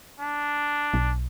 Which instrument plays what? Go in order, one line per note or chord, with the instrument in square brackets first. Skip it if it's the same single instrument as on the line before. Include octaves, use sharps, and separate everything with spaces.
[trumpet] D4
[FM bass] B1